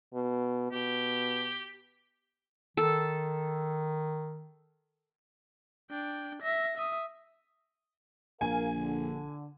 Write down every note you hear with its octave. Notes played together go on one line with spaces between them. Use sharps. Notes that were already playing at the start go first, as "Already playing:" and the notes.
B2
B2 G4
D#3 A4
D4 G5
E5 A#6
E5 D#6
A#1 A#4 F5 G#5
D3